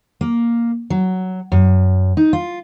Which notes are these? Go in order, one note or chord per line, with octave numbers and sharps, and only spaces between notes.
A#3
F#3
F#2
D#4
F4